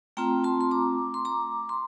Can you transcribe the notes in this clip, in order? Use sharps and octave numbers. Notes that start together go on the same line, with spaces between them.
A3 C4 F4 G5 A#5
A5 C6
C6
A#5 D6
C6
A#5 D6
C6